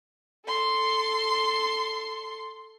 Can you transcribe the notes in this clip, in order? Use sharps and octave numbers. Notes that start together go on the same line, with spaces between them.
A4 C6